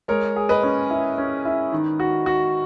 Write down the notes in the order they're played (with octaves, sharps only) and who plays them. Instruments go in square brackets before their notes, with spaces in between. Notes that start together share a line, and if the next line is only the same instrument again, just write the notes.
[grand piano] G#3 [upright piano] A#4 C#5
[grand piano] G#4
[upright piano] B4 D#5
[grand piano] C#4
E4
C#4
E4
D#3
F#4
F#4